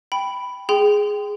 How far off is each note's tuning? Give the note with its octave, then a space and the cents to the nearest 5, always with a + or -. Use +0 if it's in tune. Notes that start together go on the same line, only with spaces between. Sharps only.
G5 +0 B5 +5
G#4 +0 G5 +0 C6 -30